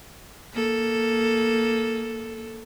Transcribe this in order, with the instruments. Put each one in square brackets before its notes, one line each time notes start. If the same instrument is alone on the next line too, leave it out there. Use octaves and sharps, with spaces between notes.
[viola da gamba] A#3 A4